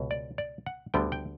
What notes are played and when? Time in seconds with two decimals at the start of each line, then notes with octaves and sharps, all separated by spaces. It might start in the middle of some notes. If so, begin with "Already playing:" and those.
Already playing: C#2 B2
0.11 D5
0.38 D5
0.66 F#5
0.94 D2 D3 G3 B3 G5
1.12 G5